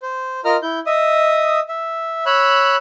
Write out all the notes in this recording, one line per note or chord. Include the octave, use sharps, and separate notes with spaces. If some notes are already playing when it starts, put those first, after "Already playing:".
C5
F4 A#4 D#5 A#5 F6
E4 G6
D#5 E5 D#6
E5
C#5 B5 E6 F#6